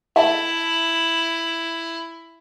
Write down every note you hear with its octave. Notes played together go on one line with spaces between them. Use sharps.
E4 E5 A5